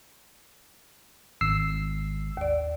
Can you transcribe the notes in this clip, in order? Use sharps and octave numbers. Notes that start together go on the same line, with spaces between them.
G#1 E6 C7
D#2 D5